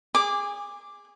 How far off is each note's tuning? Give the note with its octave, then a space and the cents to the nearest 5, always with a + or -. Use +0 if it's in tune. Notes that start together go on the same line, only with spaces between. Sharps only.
G#4 -15 G#5 -30 D6 +5